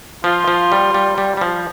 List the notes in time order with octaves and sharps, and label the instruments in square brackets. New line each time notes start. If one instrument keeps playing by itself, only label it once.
[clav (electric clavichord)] F3 [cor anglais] F4
[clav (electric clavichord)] F3
G3
G3
G3
G3
F3